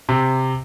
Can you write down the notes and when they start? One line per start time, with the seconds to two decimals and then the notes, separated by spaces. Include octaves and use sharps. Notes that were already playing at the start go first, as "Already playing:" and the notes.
0.09 C3